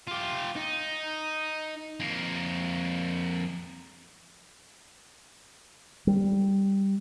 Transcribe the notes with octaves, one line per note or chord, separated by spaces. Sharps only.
F4 G4
D#4
F2 A#3
G3